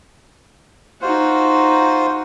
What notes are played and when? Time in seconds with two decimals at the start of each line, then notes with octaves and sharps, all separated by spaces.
1.02 D#4 F4 F#4 C5